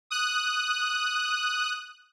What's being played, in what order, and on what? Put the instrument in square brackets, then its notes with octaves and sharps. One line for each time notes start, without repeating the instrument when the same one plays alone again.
[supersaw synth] D#6 F#6